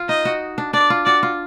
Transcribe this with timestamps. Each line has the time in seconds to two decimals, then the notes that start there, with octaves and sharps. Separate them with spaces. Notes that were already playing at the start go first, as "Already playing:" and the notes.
Already playing: F4
0.08 D#4 D#5
0.25 F#4
0.58 D4
0.73 D4 D5
0.90 F4
1.05 F#4 D5
1.23 F4